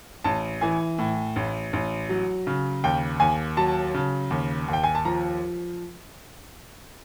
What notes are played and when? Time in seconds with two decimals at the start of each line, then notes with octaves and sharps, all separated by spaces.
0.24 A1 A5
0.61 E3 G#5
0.98 A2
1.36 A1
1.73 A1
2.09 F#3
2.47 C#3
2.84 D#2 G5
3.20 D#2 G#5
3.57 F#3 A5
3.94 C#3
4.31 D#2
4.68 D#2
4.73 G5
4.84 G#5
4.95 A5
5.05 F3 A#5